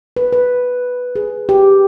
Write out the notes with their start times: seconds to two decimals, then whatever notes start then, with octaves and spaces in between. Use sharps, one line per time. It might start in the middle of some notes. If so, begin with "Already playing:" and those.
0.17 B4
0.33 B4
1.16 G#4
1.49 G4